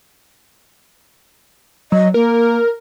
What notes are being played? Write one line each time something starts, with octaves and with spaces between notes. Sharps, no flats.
F#3 D#5
A#3 A#4